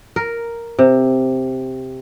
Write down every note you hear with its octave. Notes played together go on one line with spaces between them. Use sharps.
A#4
C3